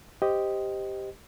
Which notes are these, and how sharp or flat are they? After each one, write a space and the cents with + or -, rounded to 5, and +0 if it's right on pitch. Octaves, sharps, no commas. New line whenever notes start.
G4 +0 C5 -15 D#5 +0